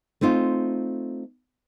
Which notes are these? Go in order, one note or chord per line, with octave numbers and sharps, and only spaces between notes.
A3 C4 D#4 F4